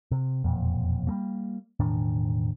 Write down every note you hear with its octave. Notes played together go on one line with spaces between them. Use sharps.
C3
E1 F2 A#2
G3 A3 A#3
E1 A2 D#3 D4